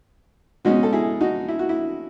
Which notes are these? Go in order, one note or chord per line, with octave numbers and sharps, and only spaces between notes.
B2 G#3 C#4 D#4 F#4
A4
E4 G#4
D#4 F#4
E4
F#4
E4